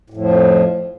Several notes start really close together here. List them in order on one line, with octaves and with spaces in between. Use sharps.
A2 F2 F3